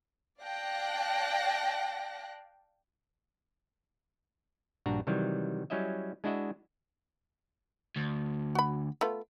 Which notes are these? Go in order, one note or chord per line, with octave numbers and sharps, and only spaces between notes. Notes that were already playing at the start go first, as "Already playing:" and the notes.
D5 F5 G5 A5 F#6 A#6
A#1 G2 D4 F#4 A#5
C3 D#3 E3 F#3 G3
F#3 G3 C#4 E4 D#5 E5
G#3 D4 E4 F#4 D#5 E5
D2
F#4 B5
A3 B3 F4